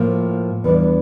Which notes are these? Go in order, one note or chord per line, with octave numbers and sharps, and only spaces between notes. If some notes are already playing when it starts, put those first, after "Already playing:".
Already playing: A2 F3 A#3
E2 E3 G3 D4